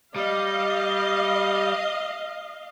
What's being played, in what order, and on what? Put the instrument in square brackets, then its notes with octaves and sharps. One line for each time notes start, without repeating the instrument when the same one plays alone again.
[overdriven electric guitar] G3 [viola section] D#5 F5